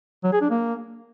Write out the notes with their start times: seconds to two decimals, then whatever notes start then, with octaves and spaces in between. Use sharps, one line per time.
0.24 F#3
0.33 G#4
0.42 D4
0.50 A#3